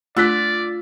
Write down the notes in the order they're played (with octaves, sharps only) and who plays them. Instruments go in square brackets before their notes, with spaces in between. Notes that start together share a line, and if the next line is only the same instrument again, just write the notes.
[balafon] A3 D4 [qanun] F4 [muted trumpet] D5 [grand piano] E6 F#6 B6